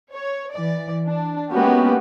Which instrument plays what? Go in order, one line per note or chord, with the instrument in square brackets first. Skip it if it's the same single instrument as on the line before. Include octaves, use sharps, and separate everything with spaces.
[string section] C#5
E3 D5
D4
G#3 A#3 B3 C#4 F#4 G4